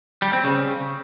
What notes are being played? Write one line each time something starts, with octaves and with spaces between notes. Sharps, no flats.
G3
C4
C#3